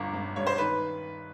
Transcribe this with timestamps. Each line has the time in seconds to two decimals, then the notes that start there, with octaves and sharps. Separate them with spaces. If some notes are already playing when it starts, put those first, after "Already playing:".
Already playing: G1 E2 D3
0.14 G1
0.36 G2 C#5
0.47 C5
0.58 D#3 B4